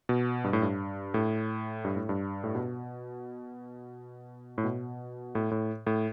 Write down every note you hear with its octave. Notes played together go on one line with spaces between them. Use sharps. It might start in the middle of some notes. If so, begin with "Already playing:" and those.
B2
G2
A2
G2
A2
G2
A2
G2
A2
B2
A2
B2
A2
A2
A2